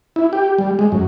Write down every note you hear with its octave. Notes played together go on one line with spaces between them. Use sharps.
E4
G4
G3
G#3
F#2